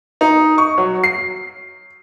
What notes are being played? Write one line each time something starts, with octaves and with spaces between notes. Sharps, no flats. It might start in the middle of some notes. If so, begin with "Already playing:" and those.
D#4
C#6
F#3
C7